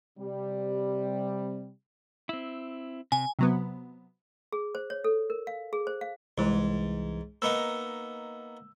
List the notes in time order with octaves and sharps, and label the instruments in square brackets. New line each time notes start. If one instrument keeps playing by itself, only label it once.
[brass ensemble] C3 G3
[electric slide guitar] C4 E4
[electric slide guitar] C3 [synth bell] G#5
[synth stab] C3 F#3 B3
[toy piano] G#4
C5
C#5
A4
A#4
F5
G#4
C5
F5
[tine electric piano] C2 E3 [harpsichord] G#2
[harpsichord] A#3 B3 D#4 [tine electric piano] E6